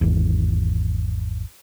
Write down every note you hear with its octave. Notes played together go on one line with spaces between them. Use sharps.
G#1 E2